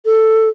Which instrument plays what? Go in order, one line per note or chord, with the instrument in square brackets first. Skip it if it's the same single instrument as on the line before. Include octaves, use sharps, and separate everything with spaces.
[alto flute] A4